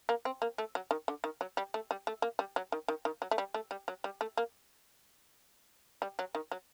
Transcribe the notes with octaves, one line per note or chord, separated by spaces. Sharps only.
A#3
C4
A#3
A3
F#3
D#3
D3
D#3
F#3
G3
A3
G3
A3
A#3
G3
F#3
D#3
D#3
D#3
F#3
A3
G3
A3
G3
F#3
G3
A3
A#3
G3
F#3
D#3
F#3